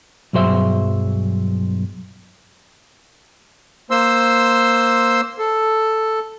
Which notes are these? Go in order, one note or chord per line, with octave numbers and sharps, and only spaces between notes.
B1 G2 F#3 G#4 C5 E5
A#3 C5 C6 E6
A4